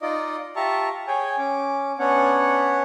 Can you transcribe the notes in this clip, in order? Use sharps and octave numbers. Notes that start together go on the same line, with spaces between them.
D#4 F4 D5 D#5
F4 G4 E5 A5 A#5 C#6
G#4 C#5 G5 G#5
C#4 D6
B3 C#4 D4 C#5 F#5